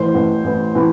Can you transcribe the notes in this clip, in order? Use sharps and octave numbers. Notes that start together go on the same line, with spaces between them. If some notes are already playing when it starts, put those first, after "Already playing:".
Already playing: A1 A2 E3 C5
A1 A2 E3
A1 A2 E3
A2 E3